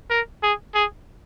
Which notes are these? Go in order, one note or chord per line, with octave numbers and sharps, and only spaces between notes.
A#4
G#4
G#4